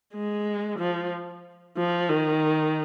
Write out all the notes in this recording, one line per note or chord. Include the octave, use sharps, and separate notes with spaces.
G#3
F3
F3
D#3